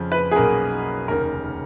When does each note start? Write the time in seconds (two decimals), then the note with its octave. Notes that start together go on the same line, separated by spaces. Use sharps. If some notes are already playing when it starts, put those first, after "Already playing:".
Already playing: F2 C#3 F3
0.12 B4
0.31 G#4
0.35 B1 B2 A#3 C#4 A#4
1.08 F1 D#2 C#3 A#4